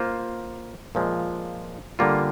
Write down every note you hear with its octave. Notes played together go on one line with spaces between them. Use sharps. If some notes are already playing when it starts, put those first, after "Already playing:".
Already playing: A#3 F4 C5
A#2 F3 G#3
D3 G3 A#3 F4